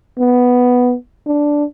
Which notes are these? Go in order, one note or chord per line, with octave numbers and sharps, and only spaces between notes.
B3
D4